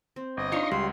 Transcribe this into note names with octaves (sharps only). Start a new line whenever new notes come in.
C4
G1 D#5
D4 D#4 F4 C#5 C6 C#6
C#2 G3 F#4 C6